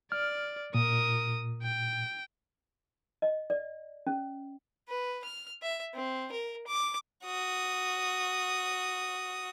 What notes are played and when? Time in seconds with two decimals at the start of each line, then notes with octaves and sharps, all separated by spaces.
0.12 D5 F6
0.74 A#2 A#4 D#6
1.62 G5
3.22 D#5
3.50 D5
4.07 C#4
4.89 B4
5.24 F6
5.62 E5
5.94 C4
6.32 A#4
6.67 D6
7.25 F#4 D#6